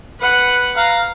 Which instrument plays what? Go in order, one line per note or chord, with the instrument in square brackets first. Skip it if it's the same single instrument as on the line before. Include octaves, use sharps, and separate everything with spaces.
[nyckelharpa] B4 F#5
[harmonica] F5 A#5